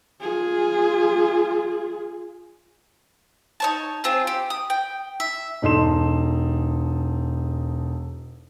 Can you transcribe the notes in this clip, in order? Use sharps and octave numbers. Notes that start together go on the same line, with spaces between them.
F4 G#4
D#4 C#5 A5
C4 F4 G#4
G4
D#6
G5
E5
E1 D#4 A4 C6 E7